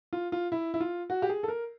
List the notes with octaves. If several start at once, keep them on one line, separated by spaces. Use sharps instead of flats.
F4
F4
E4
E4
F4
F#4
G4
G#4
A4
A#4